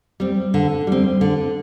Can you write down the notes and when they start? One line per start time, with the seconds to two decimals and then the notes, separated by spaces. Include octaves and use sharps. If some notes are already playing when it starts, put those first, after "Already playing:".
0.20 G3 C4
0.54 D3
0.87 G3 C4
1.21 D3